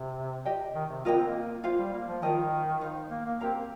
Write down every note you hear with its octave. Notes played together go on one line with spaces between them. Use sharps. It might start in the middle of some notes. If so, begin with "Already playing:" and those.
Already playing: C3
G4 D#5 G5
D#3
C3
A#3 F4 A#4 D#5 G5
C4
A#3
F4 C5 F5
G3
A#3
F3
D#3 F4 A#4 D#5 G5
D#4 C5 F5
A#3
A#3
C4 G4 A#4 F5 A#5
A#3